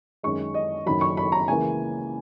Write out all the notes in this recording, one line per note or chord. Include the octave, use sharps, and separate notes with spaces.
F#2 D#3 G#3 C#6
D#5
F#1 F#2 D#3 F#3 B5
C#6
B5
A#5
C#2 C#3 E3 A#3 G#5